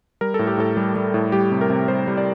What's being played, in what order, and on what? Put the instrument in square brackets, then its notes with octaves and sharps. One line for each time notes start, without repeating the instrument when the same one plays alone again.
[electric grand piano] G3 A#4
A2 A4
G4
A2 A4
G3
G3
A2
G3 G4
C3
A#4
C3
G3 C5
G3
D5